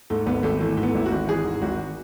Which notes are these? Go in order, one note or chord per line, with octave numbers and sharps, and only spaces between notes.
G#2 A3
G#1 B3
G#1 A3
E3 A3
G#2 A3
B3
G#1 E4
F#4
G#1
E3 G#4
G#2
G#1 F#4